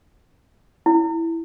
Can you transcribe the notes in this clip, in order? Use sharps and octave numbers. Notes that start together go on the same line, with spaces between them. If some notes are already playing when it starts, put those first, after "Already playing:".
E4